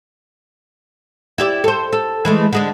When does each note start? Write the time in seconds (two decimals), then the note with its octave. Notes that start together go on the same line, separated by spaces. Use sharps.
1.38 E4 G4 D5
1.64 A4 C5
1.93 A4
2.25 E3 G#3 A3
2.53 D3 G#3 D4